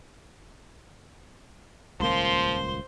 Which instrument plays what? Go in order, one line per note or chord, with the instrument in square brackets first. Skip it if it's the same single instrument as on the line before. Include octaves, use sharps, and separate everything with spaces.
[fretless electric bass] D#1 C#2 A#3 [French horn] F3 [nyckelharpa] C5 C6